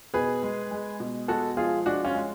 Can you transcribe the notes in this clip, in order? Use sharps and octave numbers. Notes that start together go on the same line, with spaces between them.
B2 G#4 B4
G#3
G#3
B2
G#3 F#4 A4
F3 F4 G#4
G#3 D4 F#4
C#4 F4
G#3